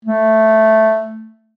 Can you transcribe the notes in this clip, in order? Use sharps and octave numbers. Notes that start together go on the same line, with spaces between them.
A3